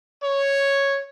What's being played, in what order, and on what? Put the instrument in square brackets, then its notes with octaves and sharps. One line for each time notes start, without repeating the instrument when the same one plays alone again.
[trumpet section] C#5